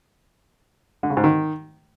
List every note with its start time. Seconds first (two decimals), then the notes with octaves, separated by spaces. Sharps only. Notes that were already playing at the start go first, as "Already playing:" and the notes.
1.03 D3
1.10 C#3
1.17 G#2
1.24 D#3